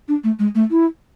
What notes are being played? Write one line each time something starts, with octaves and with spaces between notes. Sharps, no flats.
D4
A3
G#3
A3
E4